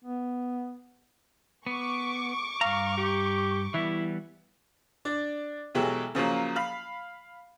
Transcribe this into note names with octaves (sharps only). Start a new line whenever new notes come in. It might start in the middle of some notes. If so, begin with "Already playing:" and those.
B3
B3 C#6 D6
G2 F5 A#5
G4
E3 G3 B3 E4
D4 D5
B2 E3 F#3 G#3 G4 A4
C#3 F3 F#3 A#3
F5 B5